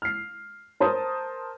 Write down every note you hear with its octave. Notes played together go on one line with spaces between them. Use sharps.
F6 C7
A#4 C5 A5 D#6